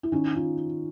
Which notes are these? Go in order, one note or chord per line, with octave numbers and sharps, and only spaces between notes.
E4
D#3 C#4 D#4
D#4 F4